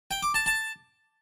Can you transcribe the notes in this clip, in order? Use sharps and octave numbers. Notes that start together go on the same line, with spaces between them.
G5
D6
A5
A5